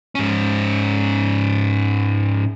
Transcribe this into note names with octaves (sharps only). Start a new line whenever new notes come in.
G#2 C#4